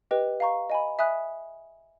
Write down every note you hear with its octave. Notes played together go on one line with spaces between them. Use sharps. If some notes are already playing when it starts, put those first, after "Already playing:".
G4 B4 D#5 G5
F5 A#5 C#6
D#5 G#5 B5
E5 G#5 B5 D#6 F#6